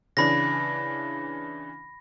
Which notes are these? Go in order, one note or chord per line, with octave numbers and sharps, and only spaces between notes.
C#3 E3 D4 B5 A#6